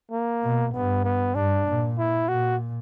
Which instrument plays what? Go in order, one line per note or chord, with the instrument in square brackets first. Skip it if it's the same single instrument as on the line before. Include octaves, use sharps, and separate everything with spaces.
[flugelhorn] A#3
[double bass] B2
[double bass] G2 [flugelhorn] B3
[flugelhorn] B3
[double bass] G2 [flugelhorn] D4
[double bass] A#2
[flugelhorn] E4
[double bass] A#2 [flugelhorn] F#4